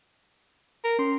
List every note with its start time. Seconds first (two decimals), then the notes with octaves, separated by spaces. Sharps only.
0.84 A#4
0.99 C#4 C6